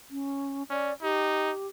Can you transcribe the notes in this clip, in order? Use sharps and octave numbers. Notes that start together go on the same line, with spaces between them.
C#4
C#4 D5
D#4 G4